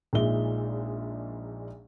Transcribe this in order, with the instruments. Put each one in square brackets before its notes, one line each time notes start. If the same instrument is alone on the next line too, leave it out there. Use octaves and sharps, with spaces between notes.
[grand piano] A#1 A#2 G#3 D#4 E5 G7